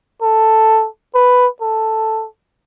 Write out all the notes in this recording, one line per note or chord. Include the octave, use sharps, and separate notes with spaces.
A4
B4
A4